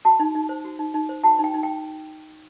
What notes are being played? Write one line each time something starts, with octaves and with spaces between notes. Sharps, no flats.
F#4 A5
D#4
D#4
C5
F#4
D#4
D#4
C5
F#4 A5
D#4 G5
D#4
G5